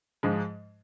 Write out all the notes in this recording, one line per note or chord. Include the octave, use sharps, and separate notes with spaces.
G#2 F3 G#3